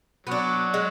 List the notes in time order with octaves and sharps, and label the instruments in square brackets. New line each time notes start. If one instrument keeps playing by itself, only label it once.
[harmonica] F#3 [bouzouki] B3 D4
[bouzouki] G#3